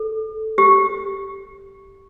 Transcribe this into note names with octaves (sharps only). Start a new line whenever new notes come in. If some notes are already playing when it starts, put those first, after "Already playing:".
Already playing: A4
G4